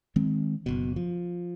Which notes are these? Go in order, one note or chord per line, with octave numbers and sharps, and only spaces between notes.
D#3 G#3 C4
F#1 B2
F3